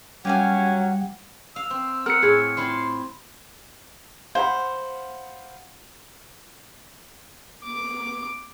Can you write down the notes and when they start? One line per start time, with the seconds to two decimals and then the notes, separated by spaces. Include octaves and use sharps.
0.25 F#3 G3 C#4 G4 F5 F#5 G#5
1.56 F5 E6
1.70 C4
2.06 A#4 F#5 F6 C#7
2.22 A2 G#4
2.57 C4 E4 F4 C6
4.35 C5 F5 F#5 B5
7.65 D6